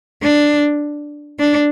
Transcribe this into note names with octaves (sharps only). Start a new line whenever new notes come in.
D4
D4